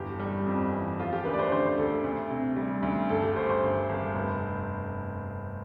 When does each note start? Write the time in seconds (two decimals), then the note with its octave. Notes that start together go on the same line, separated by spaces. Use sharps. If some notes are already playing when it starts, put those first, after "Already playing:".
Already playing: G1 E2 G4
0.19 G3
0.46 F2
0.72 E3
0.99 F3 F4
1.13 G4
1.25 D2 B4
1.34 D5
1.39 C5
1.52 D3 C5
1.78 D2 A4
2.04 D2
2.30 C3
2.56 G3
2.83 D2
3.09 G1 A4
3.23 G4
3.36 G1 C5
3.50 C5
3.63 G1
3.89 G1
4.15 F1